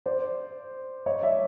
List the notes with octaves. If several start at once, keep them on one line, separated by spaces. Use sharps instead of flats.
C5 D5
C#5 D#5
D5 E5